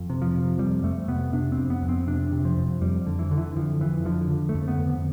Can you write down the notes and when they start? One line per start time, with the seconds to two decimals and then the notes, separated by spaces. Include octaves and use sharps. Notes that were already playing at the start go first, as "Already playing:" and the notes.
Already playing: F2
0.10 C3
0.22 F3
0.34 C3
0.59 F2 G3
0.84 F2 A3
1.08 C3 B3
1.33 C3 D4
1.52 C4
1.58 F2
1.70 B3
1.83 F2
1.89 C4
2.07 C3 D4
2.32 C3
2.45 F3
2.57 F2
2.82 F2 G3
3.07 D3
3.19 E3
3.31 D3
3.38 E3
3.56 F2 F3
3.80 F2 E3
4.05 D3 F3
4.30 D3
4.49 A3
4.55 F2
4.68 B3
4.80 F2
4.86 D3